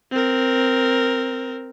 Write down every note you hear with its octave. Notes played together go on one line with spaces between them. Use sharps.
C4 A#4